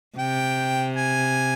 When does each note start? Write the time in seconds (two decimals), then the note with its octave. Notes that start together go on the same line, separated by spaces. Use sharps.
0.17 C3 G5
0.96 G#5